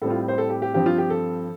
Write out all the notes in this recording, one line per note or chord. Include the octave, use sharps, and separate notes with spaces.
A2 G3 C4 A4
F4
C5
A4
G4
G4
G2 F3 C4 G4
F4
G4
A4